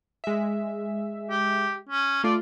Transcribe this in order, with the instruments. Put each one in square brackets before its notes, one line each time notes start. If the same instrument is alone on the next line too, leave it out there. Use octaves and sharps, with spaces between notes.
[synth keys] G#3 E5
[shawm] G4
C#4
[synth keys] A3 F4 [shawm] D5